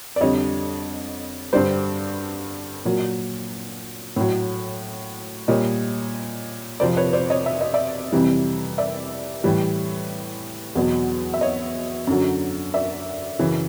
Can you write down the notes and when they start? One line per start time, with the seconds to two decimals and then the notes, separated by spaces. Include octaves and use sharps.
0.16 D5
0.21 F2 D3 G3 C#5 D#5
1.53 G2 D3 G3 C5 D5
2.85 A#2 F#3
4.16 A2 F#3
5.48 A#2 G3 C#5 D#5
6.80 F2 C3 F3 C5 D5
6.97 B4 C#5
7.13 C5 D5
7.30 C#5 D#5
7.46 E5
7.61 D#5
7.74 D5 E5
8.12 F2 C3 E3 G3
8.78 D5 E5
9.44 A2 E3 G3
10.75 E2 B2 F#3
11.34 E5
11.41 C#5 D#5
12.07 F#2 D3 F#3
12.74 D5 E5
13.39 F#2 C#3 E3